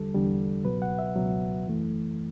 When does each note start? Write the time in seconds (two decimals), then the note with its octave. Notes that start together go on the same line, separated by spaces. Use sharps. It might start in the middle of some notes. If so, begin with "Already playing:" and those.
Already playing: E2 D3 G3 A4
0.14 E2 D3 G3
0.65 C#2 B2 F#3 B4
0.82 F#5
0.99 E5
1.15 C#2 B2 F#3
1.66 F#2 E3 A3